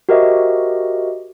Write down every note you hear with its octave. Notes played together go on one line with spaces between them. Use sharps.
F#4 G4 A#4 C5 D#5 E5